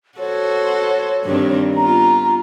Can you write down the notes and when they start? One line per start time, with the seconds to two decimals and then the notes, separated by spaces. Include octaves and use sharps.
0.19 F#4 A4 C5 C#5
1.25 G2 D#3 C4
1.76 B3 F4 A#5